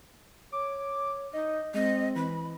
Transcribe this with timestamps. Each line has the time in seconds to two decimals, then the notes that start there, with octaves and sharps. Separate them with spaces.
0.52 C#5 D6
1.33 D#4 D#5
1.74 G#3 C4 D#5
2.16 E3 B5